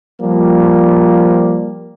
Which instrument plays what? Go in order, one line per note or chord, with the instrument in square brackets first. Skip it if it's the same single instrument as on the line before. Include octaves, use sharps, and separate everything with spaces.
[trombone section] F3 G3 A#3